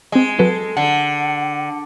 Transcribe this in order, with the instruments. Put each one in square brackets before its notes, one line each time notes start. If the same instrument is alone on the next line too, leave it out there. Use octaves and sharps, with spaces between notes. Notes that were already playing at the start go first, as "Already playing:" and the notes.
[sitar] G#3 [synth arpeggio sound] C4 D#5
[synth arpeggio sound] F#3 B4 [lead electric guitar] A4
[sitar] D3 [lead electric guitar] F#5